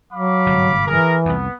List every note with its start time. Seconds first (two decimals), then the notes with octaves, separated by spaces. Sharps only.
0.13 F#3 F5 B5 D6
0.46 G1 G#2 C3
0.87 E3 G#4 A#4
1.25 C2 F2 B3